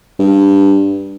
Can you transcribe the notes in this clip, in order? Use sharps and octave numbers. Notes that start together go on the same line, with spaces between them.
G2